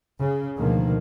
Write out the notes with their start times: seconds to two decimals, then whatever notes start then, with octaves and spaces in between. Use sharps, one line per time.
0.20 C#3
0.58 D2 B2 D#3 F3 A#3